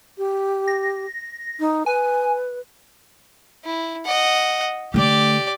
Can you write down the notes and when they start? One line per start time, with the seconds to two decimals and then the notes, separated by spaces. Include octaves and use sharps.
0.18 G4
0.68 A#6
1.60 D#4
1.86 B4 G#5
3.65 E4
4.06 D#5 F#5
4.94 D3 A3 G4 D5